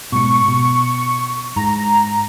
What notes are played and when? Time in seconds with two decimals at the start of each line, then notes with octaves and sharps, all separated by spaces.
0.12 G#2 B2 C#6
0.48 B2
1.56 G#2 A#5